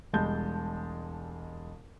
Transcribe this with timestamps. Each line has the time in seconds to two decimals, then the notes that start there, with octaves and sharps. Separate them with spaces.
0.13 E1 G3 G#3 A5 G6